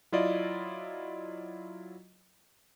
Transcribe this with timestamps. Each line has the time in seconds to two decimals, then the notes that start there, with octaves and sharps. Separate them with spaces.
0.12 F#3 E4 F4 D5 D#5